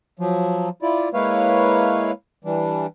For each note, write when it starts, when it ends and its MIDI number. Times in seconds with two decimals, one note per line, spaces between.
0.19 0.69 53
0.19 0.69 54
0.82 1.09 64
0.82 1.09 65
0.82 1.09 74
1.14 2.12 56
1.14 2.12 58
1.14 2.12 64
1.14 2.12 71
1.14 2.12 73
1.14 2.12 77
2.45 2.86 52
2.45 2.86 55
2.45 2.86 62